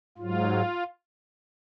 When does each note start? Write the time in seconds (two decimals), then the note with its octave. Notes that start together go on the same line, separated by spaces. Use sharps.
0.18 G#2 F#3 F4